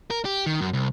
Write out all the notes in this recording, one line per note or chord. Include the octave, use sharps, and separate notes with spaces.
A#4
G4
D#3
F#2
C2